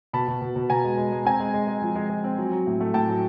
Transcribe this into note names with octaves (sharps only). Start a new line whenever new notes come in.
B2 A5 B5
B2
B2
B2
B2 G#5 A#5
G#3
G#3
G#3
C4 G#5 A#5
G#3
G#3
G#3
F3
G#3
G#3
C4
F#3
F#3
A2
A3
A2 G5 A5
F#3